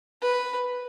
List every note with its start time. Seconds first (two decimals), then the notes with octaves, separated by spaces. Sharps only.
0.21 B4